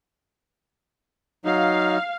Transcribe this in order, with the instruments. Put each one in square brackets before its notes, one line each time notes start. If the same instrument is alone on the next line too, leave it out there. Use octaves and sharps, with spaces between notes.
[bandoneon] F#3 D#4 [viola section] F5